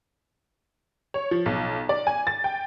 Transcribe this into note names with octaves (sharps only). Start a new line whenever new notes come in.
C#5
F3
B1
D5
G#5
A6
G5